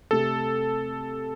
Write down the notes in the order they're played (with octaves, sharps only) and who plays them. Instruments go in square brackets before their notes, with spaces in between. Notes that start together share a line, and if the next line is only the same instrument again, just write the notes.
[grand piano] C3 A3 C4 G4 [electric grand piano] A4